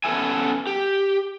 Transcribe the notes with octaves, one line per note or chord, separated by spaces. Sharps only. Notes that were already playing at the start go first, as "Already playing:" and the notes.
B3 C#4 A4 E5 G#5
G4